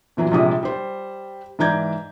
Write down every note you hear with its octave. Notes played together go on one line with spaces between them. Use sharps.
A#2 E3 F#3 B3
A#1 C3 G3 G#3 D#6
G3 C5
G#2 E3 D5 A#5 G6 G#6